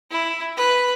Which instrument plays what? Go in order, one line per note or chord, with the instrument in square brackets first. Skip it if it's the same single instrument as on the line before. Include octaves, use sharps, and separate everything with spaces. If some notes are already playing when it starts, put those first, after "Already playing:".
[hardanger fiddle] E4
B4